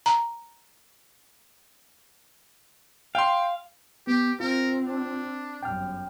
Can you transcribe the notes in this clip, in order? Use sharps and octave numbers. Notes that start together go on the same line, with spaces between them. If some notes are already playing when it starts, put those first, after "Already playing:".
A#5
F5 G5 C6
B3 G4
C4 F4 A#4
D4
G1 F#2 G5 F6